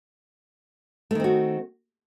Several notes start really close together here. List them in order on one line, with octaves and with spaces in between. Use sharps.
A3 D#3 C4 F#4